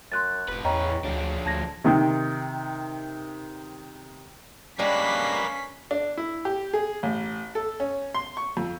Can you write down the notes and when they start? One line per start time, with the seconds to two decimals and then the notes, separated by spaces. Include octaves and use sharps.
0.12 F#2 C6 F#6 A6
0.48 F1 A2 B4
0.64 E2 C#4 D#5 G5 A#5
1.04 D2 C#3 F3 D4
1.46 D2 A5 G#6 A#6
1.84 C3 D#3
4.79 G3 G#3 A#3 C#4 D4 B4 B6 C7
5.91 D4
6.17 E4
6.45 G4
6.73 G#4
7.03 A1
7.55 A4
7.80 C#4
8.14 C6
8.37 C#6
8.57 F2